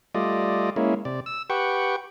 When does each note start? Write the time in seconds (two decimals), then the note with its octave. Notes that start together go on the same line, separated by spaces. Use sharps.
0.15 G3 A3 F4 D5 D#5
0.76 G#3 A#3 C#4 E4
1.05 C3 D5
1.26 E6
1.50 G4 B4 F#5 G5 C#6